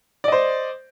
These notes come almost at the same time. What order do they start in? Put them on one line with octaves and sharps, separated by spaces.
D5 D#5 C5